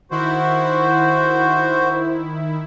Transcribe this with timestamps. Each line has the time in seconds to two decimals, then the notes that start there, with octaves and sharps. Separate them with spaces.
0.11 D#3 E4 F#4 C5